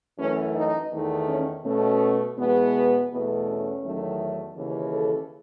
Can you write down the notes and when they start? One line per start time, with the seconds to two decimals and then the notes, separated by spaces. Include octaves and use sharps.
0.19 F#2 E3 A3 C#4
0.55 D#4
0.92 E2 D#3 A3
1.28 C#4
1.65 B2 A3 C#4
2.38 E2 B2 G#3 B3
3.11 E2 B2 A3 B3
3.47 C#4
3.83 E2 D#3 F#3 A3
4.57 D#2 C#3 E3
4.93 A4